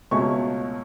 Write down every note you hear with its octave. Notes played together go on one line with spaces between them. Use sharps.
C#2 B2 A3 C#4 C#6